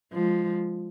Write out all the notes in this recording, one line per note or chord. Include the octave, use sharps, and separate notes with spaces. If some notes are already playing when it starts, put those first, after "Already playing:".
F3 G#3